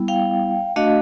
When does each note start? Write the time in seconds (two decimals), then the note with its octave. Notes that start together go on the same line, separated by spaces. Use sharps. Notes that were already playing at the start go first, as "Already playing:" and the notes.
Already playing: G3 B3 E4
0.08 F5 G5
0.76 A3 D4 F#4 D#5 F5